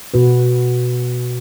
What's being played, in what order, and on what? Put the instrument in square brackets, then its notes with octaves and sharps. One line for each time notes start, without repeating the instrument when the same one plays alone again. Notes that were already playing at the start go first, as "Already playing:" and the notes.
[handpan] B2 F#4 B4